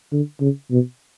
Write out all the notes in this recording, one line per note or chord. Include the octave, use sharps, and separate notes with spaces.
D3
C#3
B2